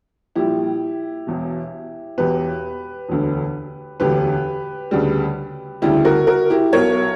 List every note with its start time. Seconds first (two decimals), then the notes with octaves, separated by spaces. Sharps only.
0.36 A#1 A#2 G3 E4 G4
1.27 E1 E2 B2
2.18 E1 E2 B2 G4 B4
3.09 E1 D2 D3
4.00 E1 D2 D3 G4 B4
4.91 D2 C#3 G3
5.82 D2 C#3 G3 E4 G4
6.05 F#4 A#4
6.27 F#4 A#4
6.50 E4 G4
6.73 B1 B2 F#3 A#4 C#5